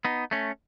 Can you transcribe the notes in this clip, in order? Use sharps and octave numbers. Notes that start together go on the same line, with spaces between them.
B3 D#4
A3 C#4